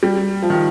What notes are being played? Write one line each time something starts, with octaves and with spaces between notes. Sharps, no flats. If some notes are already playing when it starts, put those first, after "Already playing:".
G3
F3
D#3